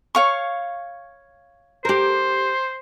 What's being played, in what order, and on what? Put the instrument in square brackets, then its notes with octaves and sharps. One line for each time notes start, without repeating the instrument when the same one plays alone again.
[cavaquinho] C#5 F5 C#6
[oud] G4 A#4 [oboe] C5